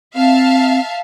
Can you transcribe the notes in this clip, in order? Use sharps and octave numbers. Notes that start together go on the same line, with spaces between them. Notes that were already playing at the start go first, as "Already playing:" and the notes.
C4 E5 F5 A5